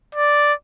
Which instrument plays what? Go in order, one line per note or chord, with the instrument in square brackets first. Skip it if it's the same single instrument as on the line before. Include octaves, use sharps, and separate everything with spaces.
[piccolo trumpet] D5